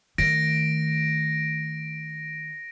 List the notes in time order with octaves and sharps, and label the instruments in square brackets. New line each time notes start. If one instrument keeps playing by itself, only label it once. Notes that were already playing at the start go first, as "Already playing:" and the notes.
[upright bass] D#3 A3 [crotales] A#6 D7